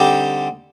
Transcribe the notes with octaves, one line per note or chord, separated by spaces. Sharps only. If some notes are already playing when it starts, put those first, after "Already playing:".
Already playing: D3 G3 C4 D#4 G4